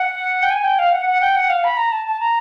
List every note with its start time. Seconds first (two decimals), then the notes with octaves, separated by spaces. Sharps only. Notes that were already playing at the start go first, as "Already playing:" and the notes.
Already playing: F#5
0.43 G5
0.50 G#5
0.64 G5
0.79 F5
0.92 F#5
1.06 F#5
1.21 G5
1.35 F#5
1.49 F5
1.64 B5
1.77 A#5
1.92 A5
2.06 A5
2.20 A#5